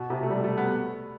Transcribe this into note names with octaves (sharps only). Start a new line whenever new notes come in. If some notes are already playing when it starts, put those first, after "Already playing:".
Already playing: B2
C3
A3
G3
A3
B3